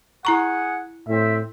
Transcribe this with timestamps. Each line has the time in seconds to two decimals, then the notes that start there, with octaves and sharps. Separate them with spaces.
0.25 E4 G#4 F#5 A#5 C#6
1.08 A2 C4 E5